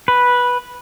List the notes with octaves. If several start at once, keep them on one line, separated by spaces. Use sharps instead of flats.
B4